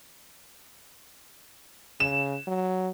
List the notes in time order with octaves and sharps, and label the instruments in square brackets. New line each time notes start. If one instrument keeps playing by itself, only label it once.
[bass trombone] C#3 [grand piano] E7
[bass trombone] F#3